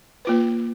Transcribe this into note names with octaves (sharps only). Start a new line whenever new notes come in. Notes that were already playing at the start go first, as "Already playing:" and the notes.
A#3 F4 B4